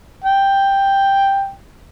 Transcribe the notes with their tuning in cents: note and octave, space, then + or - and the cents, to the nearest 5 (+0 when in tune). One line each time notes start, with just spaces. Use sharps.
G5 +5